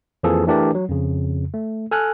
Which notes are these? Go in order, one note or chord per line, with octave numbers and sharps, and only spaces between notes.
F2 E3 F3 A#3 G#4 A4
E3 A3 D4 G4 A#4 D5
F#3
F2 C#3
A3
A4 G#5 F6 F#6